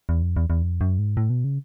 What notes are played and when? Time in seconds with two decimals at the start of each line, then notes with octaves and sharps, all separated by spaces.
0.09 E2
0.22 F2
0.36 E2
0.50 E2
0.63 F2
0.81 F#2
0.99 G#2
1.17 A2
1.30 B2
1.44 C#3